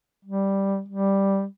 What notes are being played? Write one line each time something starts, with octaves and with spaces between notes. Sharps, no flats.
G3
G3